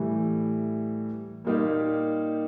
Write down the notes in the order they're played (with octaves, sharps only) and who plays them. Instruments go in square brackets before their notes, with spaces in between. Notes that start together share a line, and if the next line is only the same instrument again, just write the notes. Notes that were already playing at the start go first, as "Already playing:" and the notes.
Already playing: [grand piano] A2 E3 G3
A#2 G3 A#3 D#4 G4